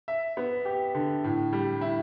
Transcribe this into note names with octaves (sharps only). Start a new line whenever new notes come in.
E5
B3
G4
D3
A2
G3
E4